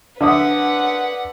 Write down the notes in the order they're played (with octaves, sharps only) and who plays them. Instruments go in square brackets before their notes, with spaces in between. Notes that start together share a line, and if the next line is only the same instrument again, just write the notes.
[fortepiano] D3 E5 D#6 [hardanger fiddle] B4 F#5